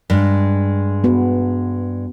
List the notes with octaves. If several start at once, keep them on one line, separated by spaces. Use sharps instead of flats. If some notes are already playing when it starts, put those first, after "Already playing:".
G2 G#3
B3 F#4 B4